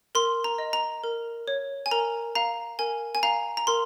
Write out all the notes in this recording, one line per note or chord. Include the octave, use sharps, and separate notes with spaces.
A#4 C6
A#5
D#5
A#5
A#4
C#5
G#5
A#4 A#5
F5 A#5
A#4 G#5
G#5
F5 A#5
A#5
A#4 C6